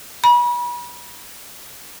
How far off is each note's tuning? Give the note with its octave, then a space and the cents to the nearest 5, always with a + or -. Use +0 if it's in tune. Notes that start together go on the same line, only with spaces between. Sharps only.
B5 -35